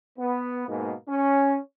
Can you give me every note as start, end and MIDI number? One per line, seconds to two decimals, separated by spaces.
0.18 0.66 59
0.69 0.94 44
0.69 0.94 47
0.69 0.94 58
1.08 1.58 61